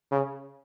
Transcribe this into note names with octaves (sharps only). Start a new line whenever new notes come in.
C#3